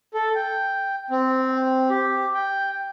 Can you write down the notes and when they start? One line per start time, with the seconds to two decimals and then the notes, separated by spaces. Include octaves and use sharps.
0.14 A4
0.35 G5
1.10 C4
1.90 G4
2.34 G5